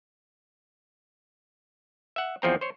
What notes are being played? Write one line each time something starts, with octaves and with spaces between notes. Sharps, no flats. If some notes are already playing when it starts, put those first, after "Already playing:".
E5 F#5
E2 F3 C4 A#5
C5 C#5